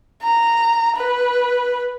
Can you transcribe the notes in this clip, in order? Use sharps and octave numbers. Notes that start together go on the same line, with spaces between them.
A#5
B4